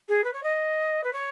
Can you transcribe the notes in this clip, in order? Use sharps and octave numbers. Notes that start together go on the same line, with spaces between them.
G#4
B4
C#5
D#5
B4
C#5